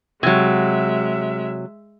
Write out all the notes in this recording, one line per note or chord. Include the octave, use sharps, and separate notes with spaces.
C3 F#3 G#3 E5